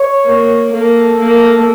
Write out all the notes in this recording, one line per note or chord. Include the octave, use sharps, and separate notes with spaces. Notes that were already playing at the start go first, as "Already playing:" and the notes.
Already playing: C#5
A#3
A#3 A4
A#3